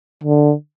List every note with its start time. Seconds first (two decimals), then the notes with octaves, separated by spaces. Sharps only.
0.24 D3